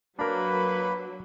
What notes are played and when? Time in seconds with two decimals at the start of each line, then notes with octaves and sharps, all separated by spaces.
0.19 F#3 A#3 D4 A#4 B4 B5